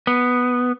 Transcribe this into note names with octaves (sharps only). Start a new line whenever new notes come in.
B3